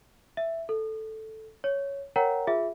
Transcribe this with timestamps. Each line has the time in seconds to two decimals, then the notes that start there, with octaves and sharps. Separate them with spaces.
0.37 E5
0.69 A4
1.64 C#5
2.16 A#4 C#5 F#5 G5 A#5
2.47 F4 G#4 E5